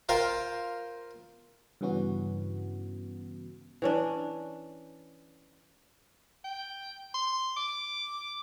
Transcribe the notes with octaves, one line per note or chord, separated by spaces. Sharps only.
F4 A#4 C5 F5 G5
G2 C#3 E3 B3 C#4 F#4
E3 C#4 D4
G5
C6
D6